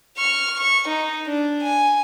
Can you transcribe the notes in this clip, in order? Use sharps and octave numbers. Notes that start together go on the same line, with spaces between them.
C#6 F6
C#6
D#4
D4
G#5